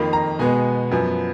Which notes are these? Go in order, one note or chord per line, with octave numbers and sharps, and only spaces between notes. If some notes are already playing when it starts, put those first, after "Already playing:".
Already playing: F2 D#3 A#3 B5
A#5
B2 G#3 B3 G#5
F#2 F3 B3